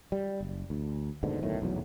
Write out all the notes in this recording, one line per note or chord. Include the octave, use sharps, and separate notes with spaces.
G3
F#1
D2
D#2 G#2 B2 D3
D1 B1 A2 D#3
F1 B1 E2 F#3